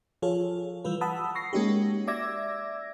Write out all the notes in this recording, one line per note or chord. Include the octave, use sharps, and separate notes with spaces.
F3 F4 G#4 A4 C#5
E3 G3 F4 B4
F#5 A5 B5 D#6 E6
C#6 A#6 C7
G#3 A#3 C#4 D#4 F#4 G4
D5 E5 D6 E6 G#6 A#6